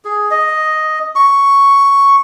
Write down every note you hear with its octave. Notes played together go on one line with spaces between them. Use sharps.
G#4
D#5
C#6